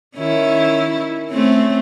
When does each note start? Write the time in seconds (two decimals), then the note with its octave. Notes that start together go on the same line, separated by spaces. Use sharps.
0.17 D#3 C#4 E4
1.30 A3 C4 C#4